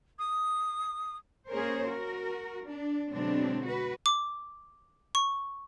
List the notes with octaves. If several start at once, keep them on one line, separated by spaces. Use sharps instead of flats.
D#6
A#3 C#4 G#4 A#4 C5 C#5
F#4 A#4
D4
B2 D3 F#3 G#3 C4 D4
F#4 B4
D6
C#6